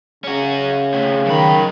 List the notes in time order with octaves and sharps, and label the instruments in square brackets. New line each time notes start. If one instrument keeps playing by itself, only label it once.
[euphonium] C#3 [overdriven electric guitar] C#4 F#4
[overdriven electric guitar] A2 C3
[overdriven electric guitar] F#2 B5 [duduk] D#3